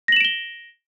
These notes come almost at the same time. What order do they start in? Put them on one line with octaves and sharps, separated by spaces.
A#6 F#7 E7 D7 G7